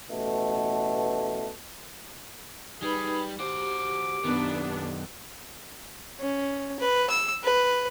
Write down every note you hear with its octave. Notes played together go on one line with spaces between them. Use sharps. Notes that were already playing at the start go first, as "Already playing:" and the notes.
A1 B2 A3
G3 D#4 G#4 B4 B5
F#4 G4 C5 D6
F#2 D#3 B3 D4
C#4
B4
E6
B4